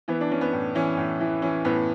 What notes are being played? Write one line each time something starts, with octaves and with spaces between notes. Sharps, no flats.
E3 B3
D4
E3 C#4
B3
A2
E3 C#4
A2
E3
E3 C#4
A2 B3